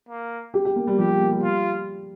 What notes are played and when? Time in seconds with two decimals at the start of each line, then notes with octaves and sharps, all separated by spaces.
0.09 A#3
0.54 G4
0.65 G4
0.76 A#3
0.87 G3
0.98 F3 G4
1.10 G3
1.21 A#3
1.32 G3
1.43 G3 F4